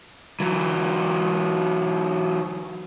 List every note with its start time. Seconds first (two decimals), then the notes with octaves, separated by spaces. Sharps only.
0.40 E3 F#3